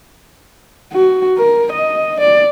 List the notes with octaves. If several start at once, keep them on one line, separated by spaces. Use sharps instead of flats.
F#4
A#4
D#5
D5